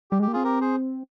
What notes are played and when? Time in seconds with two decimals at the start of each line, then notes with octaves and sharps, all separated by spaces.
0.11 G3 G4
0.20 G#3
0.22 G4
0.28 A#3
0.33 C4 F4 G#4
0.44 G4 A#4
0.61 G#4 C5